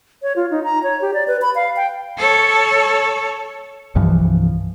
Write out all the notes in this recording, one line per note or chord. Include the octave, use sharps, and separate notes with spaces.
C#5
F4
D#4
A#5
C#5
G4
D5
B4
B5
F5
G5
A4 C#5
C2 G2 E3 F3